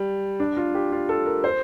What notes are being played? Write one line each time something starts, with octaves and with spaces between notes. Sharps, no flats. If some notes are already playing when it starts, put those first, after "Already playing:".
Already playing: G3
D4
F4
G4
F4
A4
A#4
C5